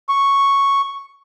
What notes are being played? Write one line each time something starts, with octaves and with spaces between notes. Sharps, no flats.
C#6